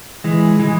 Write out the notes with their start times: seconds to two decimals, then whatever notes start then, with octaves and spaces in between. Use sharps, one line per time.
0.24 E3 G#3
0.59 E3 G#3